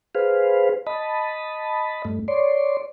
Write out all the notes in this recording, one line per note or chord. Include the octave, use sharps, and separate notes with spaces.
G#4 B4 C5 F5
D#5 A5 B5
G2 A3
C#5 D5 C6